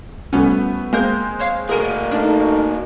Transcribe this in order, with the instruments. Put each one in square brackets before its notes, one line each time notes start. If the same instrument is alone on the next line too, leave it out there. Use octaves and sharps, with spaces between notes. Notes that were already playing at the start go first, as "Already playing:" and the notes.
[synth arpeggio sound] C2 F3 C#4 [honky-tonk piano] A3 B3 F#4
[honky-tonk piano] G#3 C4 G6 [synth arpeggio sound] A#3 A#4
[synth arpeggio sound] C5 C#5 F5
[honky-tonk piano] F1 D#7 [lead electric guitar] A#3 F#4 [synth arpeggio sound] G#4 A#4
[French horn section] A3 D#4 [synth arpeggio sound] D4 [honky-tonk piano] F6